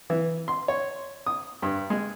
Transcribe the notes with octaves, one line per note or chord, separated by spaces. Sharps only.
E3
C6
C#5
D#6
G2
G#3